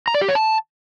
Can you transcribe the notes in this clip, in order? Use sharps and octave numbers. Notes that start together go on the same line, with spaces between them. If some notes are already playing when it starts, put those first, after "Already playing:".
A#5
D5
G4
C#5
A5